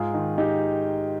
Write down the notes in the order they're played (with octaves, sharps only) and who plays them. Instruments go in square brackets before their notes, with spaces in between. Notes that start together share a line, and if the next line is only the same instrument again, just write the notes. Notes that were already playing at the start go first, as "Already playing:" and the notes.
Already playing: [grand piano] G#2 F4 G#4
D#3
D#3 D#4 G4